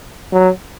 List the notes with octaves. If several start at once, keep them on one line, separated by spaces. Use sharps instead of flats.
F#3